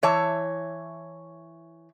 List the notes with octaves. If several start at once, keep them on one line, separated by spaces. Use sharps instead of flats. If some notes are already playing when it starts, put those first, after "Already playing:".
E3 C#5 E5 A5